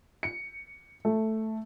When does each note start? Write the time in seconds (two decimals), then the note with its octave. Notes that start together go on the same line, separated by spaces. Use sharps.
0.23 C#7
1.05 A3